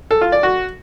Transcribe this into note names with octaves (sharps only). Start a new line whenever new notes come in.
A4
F4
D5
F#4